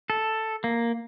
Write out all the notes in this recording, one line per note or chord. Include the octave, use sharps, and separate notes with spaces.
A4
A#3